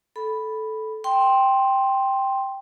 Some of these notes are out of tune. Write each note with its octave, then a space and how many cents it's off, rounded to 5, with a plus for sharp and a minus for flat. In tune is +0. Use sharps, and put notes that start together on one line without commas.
A4 -10 B5 +0
G5 +0 C6 +10